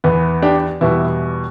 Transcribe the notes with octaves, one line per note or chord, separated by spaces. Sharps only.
E2 E3 B3
D4 G4
E2 B2 G3 B3 E4